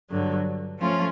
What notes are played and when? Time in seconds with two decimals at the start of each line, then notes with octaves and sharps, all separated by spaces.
0.10 G2 D3 F#3
0.78 F3 A3 C#4 F4